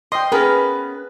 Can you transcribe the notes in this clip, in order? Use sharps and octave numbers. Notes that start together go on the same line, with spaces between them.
D#5 G5 C6
B3 C#4 G#4 A#4 B4